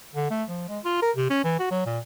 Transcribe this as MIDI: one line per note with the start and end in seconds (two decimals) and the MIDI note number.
0.15 0.28 50
0.31 0.44 57
0.49 0.67 53
0.69 0.79 56
0.85 1.01 65
1.02 1.11 70
1.16 1.29 48
1.30 1.40 61
1.44 1.58 52
1.59 1.69 66
1.71 1.83 54
1.86 1.99 46